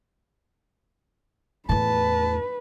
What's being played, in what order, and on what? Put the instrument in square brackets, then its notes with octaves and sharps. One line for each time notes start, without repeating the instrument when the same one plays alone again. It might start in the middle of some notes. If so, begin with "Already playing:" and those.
[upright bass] E2 A2 [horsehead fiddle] B4 [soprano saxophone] A5